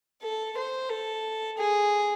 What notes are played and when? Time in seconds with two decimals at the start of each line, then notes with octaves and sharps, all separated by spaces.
0.23 A4
0.57 C5
0.90 A4
1.58 G#4